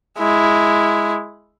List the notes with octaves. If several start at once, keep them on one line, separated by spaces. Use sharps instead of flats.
G#3 E4